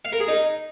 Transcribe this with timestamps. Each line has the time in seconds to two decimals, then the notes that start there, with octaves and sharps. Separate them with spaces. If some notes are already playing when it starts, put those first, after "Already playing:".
0.05 F5
0.12 A#4
0.20 G#4
0.28 D#4